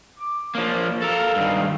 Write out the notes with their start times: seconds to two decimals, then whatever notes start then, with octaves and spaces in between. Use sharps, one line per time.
0.19 D6
0.55 F3 A#3 D4 C#5 F5
1.02 A4 A#4 F5
1.36 G2 D#3